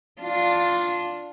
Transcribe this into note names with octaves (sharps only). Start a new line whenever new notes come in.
D4 F4